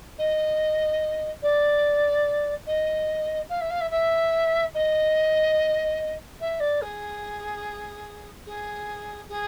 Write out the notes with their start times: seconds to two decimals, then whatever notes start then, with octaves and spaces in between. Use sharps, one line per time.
0.18 D#5
1.42 D5
2.67 D#5
3.49 F5
3.60 E5
3.70 F5
3.80 E5
3.90 E5
4.74 D#5
6.40 E5
6.60 D5
6.81 G#4
8.46 G#4
9.29 G#4